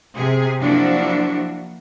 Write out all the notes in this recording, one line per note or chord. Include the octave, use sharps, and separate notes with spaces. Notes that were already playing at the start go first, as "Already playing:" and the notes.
C3 G#4
F3 F#3 A#3 D4 E4 F#4